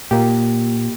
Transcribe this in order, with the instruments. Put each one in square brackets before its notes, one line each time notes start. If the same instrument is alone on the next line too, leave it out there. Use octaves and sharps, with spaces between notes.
[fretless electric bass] A#2 [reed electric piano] A#3 G4